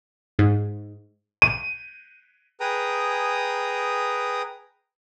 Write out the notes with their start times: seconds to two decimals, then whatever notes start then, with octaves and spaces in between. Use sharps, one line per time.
0.39 G#2
1.42 D#7
2.60 G#4 B4 G5 A#5 D#6